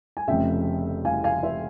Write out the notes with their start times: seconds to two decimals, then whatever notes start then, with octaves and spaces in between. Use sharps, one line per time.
0.17 G#5
0.28 F1 F2 C#3 E5 G5
1.05 F5 G#5
1.24 F5 G#5
1.43 C5 E5